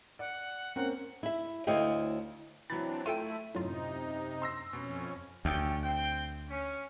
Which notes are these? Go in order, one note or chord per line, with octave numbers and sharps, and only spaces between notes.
D5 F#5
A#3 C4 C#4 F#5
E4 E5
D2 E4 C#5 D#5 F5 G5
E3 F#3 C4 D4 B5 A6
A3 E4 F4 A4 E5 G5 D#7
F#2 A2 C3 F#3 D#4 F4
C6 E6 A#6
F2 B2 C#4
D2 A3 C#4 G5
C4 G5
C#4